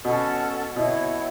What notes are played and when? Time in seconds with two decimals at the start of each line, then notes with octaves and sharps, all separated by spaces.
0.05 B2 C#4 A4 F#5
0.76 B2 E4 C#5 F#5